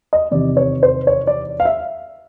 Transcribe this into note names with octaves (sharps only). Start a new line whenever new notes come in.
D#5
E2 C3 D#3 D5
C#5
C5
C#5
D5
F5
E5